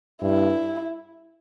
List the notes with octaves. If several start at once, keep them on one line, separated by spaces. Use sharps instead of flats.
G2 E4